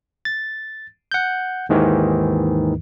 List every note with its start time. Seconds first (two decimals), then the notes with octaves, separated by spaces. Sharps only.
0.25 A6
1.12 F#5 G6
1.69 D#2 G#2 D#3 E3